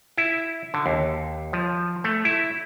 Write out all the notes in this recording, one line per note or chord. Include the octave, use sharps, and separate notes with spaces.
E4
D3
D#2
F3
A3
E4